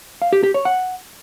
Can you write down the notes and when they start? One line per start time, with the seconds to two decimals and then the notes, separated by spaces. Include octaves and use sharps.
0.22 F5
0.33 G4
0.43 G4
0.54 C#5
0.65 F#5